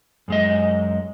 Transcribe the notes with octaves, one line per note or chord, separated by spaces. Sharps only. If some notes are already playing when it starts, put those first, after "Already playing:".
F#2 G#3 D#5